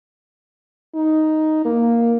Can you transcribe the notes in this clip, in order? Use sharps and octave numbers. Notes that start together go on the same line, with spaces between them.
D#4
A#3